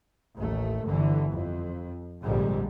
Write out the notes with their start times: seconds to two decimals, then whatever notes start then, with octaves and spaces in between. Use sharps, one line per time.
0.38 A1 D#2 A3
0.86 G1 D3 E3
1.31 F2
2.24 A#1 F2 G#2 D3 G3 G#3